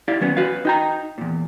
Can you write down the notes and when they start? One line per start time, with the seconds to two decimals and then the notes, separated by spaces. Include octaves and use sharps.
0.08 E4 G4 D5 F5
0.20 D#2 F#3 B3 C#4
0.37 F#4 B4 F5
0.65 D#4 G5 A#5
1.18 E2 A#2